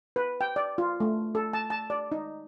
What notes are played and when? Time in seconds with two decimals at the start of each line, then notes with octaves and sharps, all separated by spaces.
0.16 B4
0.41 G5
0.56 D5
0.78 F4
1.00 A3
1.35 A4
1.53 A5
1.70 A5
1.90 D5
2.12 D#4